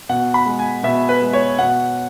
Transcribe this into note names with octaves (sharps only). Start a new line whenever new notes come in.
B2 F#5
B5
G#3
G#5
B2 E5
B4
G#3
C#5
B2 F#5